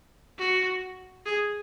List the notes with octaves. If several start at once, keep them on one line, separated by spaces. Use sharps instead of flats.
F#4
G#4